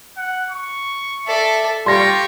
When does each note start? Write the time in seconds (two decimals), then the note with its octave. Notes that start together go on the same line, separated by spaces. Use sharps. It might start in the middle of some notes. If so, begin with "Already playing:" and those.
0.17 F#5
0.50 C#6
1.27 A4 D5 E5
1.86 G3 F4 G4 C6 C#6 A#6